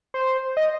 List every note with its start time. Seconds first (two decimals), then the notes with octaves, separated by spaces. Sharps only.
0.14 C5
0.57 D#5